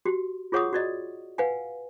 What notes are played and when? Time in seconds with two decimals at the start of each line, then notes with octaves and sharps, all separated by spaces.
0.05 F#4 G4
0.52 F4 G#4 C#5 F#5 C#6 D#6
0.73 F#4 D5 D#5
1.38 B4 F5 F#5 G#5